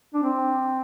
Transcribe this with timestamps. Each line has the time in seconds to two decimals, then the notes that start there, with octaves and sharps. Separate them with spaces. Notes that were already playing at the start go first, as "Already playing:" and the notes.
0.14 D4
0.23 C4